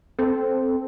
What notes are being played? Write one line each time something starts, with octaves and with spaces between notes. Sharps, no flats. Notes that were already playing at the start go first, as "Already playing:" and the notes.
C4 A4